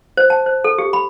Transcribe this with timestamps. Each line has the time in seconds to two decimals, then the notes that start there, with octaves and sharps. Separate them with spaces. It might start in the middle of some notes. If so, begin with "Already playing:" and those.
0.17 C5
0.30 A5
0.46 C5
0.64 A4
0.78 G4
0.93 B5